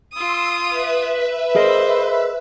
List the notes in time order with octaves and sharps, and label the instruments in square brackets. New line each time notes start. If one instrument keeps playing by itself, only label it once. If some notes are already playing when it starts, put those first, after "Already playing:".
[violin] F4 D#6 [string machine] C6 E6
[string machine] B4 E5
[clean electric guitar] G#4 A#4 D#5 [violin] C5